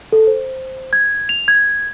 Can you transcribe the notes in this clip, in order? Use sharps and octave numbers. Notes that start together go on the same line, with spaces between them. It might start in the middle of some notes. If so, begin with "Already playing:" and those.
A4
C5
G#6
F7
G#6